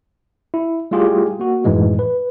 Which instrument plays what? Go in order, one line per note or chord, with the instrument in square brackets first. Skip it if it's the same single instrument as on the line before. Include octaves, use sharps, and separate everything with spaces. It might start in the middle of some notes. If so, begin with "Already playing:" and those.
[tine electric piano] E4
G3 A3 E4 F4 G4 G#4
A#3 F#4
F#2 A2 E3 G#3 D#4
B4